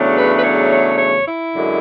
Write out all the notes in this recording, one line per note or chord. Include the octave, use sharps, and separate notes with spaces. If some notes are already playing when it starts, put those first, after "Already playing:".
Already playing: E2 C#3 F#3 A3 D4
B4
B4
C#5
C#5
C#5
E4
F#2 D3 G#3